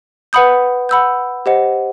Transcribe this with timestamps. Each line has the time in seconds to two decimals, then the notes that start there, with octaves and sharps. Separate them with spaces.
0.33 B4 F#5 B5 D#6 G6
0.89 F#5 B5 E6 G6
1.46 G4 C5 D#5 F#5